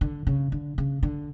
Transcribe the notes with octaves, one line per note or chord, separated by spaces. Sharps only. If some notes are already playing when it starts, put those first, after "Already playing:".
D3
C#3
D3
C#3
D3